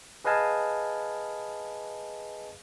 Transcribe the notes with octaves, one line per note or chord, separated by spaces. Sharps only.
G#4 B4 D#5 F5 G#5 A5